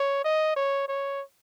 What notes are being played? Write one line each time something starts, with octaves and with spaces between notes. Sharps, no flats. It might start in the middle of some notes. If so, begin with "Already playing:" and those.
Already playing: C#5
D#5
C#5
C#5